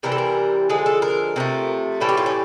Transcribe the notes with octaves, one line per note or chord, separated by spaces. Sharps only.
C3 E3 G3 A#4
A4
A#4
D3 F3 G#3 G#4
A4
A#4
C3 F3 A3
A2 E3 G3 A4
G4
F4
C#4